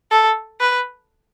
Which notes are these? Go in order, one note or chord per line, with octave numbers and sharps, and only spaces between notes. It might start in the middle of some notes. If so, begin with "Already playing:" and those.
A4
B4